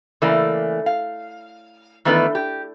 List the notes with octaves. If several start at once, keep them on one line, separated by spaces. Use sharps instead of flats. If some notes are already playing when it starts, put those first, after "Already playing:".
C#3 E3 A3 A#3 D5
F5
D#3 E3 A3 B3 D4 B4
G4